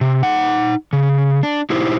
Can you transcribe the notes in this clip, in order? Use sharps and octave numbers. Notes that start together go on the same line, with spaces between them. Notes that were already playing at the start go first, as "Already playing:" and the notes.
C3
D#4 F#5
C#3
D4
D#4 E4 G4 C5